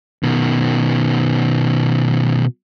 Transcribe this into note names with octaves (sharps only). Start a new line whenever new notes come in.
B2 D#3